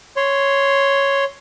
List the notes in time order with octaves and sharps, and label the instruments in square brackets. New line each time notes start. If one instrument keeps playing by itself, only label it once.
[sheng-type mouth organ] C#5 C6